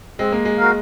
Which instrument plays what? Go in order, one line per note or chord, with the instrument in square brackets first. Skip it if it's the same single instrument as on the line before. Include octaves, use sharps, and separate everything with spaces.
[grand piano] G#3 [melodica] C4
[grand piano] A#3
G#3
[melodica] F#4 A#4 F5